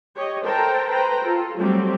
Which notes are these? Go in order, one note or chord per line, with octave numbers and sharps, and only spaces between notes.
G4 C#5 D#5
A4 A#4 C5 G5 A5 A#5
B4 C5 G5 A#5
F4 A4
F#3 G3 A3 C4 G4